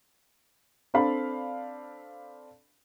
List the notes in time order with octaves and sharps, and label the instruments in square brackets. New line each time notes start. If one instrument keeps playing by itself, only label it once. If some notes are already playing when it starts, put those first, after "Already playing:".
[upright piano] C4 D4 A4 F5 B5